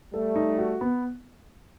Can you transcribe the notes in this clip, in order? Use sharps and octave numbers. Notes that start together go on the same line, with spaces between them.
G3 A3 A4
D#4
F#4
B3